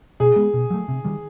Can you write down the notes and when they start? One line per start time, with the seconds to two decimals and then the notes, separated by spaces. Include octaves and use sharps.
0.20 B2 G#4
0.36 G#3 B3
0.54 B2
0.70 F#3 A3
0.88 C3
1.05 D#3 G3